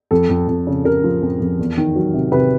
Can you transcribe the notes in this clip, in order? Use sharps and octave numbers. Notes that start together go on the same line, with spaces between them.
F2 A4
F2
F2
C#3
C#3 A#4
F3
F2
F2
E2
D#3
F#3
C3
C3 B4